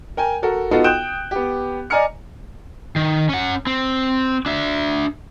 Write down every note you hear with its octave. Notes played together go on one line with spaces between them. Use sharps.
A#4 G5 G#5
F#4 A4 A#4
B3 D#4 F4 F#4 A4
G5 D#6 F#6 G6 D7 E7
B3 G4
D5 D#5 G#5 A#5 F6 C#7
D#3
C#4 F#5
C4
D4 E5